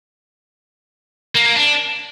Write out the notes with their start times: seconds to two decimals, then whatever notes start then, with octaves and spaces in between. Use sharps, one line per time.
1.35 A#3
1.46 A#3
1.56 D4